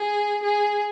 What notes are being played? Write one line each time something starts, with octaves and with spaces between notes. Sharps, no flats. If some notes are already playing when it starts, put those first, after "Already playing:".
Already playing: G#4
G#4